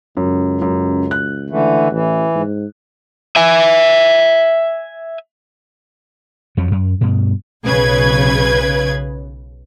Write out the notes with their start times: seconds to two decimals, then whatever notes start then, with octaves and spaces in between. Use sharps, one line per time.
0.17 C#2 F#2
0.62 F#2
1.11 F#6
1.50 D3 E3 A3
1.91 A1 E3
2.35 G#2
3.36 E5 G#5
6.57 F2 F3 F#3
6.71 F#2
7.01 G2 B2
7.65 B1 C#3 B4 G#6